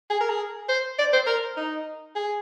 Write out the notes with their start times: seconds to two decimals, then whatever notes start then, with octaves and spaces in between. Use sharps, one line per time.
0.10 G#4
0.20 A#4
0.30 G#4
0.69 C5
0.99 D5
1.13 C5
1.27 A#4
1.57 D#4
2.15 G#4